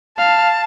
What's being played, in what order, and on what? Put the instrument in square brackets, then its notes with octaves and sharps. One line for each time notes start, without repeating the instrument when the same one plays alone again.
[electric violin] F5 [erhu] A5